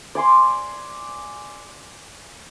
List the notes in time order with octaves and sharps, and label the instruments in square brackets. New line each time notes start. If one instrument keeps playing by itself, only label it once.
[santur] D5 G#5 C6 D6